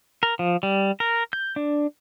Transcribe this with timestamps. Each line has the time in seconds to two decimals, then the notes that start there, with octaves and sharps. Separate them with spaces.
0.23 A#4
0.39 F3
0.63 G3
1.00 A#4
1.33 G6
1.56 D4